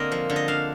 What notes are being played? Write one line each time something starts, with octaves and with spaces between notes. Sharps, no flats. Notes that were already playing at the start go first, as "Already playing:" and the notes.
Already playing: D3 A#3 C4 D#5
F3
D3
D#5
D4 F5